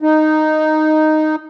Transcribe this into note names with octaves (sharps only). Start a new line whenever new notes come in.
D#4